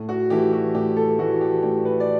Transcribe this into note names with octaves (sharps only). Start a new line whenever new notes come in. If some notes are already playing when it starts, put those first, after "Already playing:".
Already playing: A2
F#4
E3 A3 E4 G4
F#4
A2 G4
A4
E3 A3 E4 F#4
G4
A2 G4
B4
D5